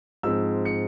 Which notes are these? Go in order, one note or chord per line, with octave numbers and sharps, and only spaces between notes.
G#2 F3 G#3 C4 E6
C#7